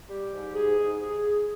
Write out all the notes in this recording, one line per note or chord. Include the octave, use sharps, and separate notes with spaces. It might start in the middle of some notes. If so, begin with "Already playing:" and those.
G3 G4
G#2
G#2 G#4
G#2
G#4